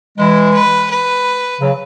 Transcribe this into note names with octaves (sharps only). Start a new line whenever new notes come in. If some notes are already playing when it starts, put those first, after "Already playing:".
E3 G#3 E4
B4
B4
C#3 F#3